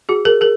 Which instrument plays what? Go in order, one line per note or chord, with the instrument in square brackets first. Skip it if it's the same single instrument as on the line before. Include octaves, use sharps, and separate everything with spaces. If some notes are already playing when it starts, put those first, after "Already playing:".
[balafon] F#4 G#4
G#4 A#4
G#4 A#4